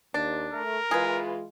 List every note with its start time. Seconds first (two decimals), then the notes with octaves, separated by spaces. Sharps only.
0.14 D#2 D4
0.53 A3 A#4
0.91 E3 G#3 F4 G#4 B4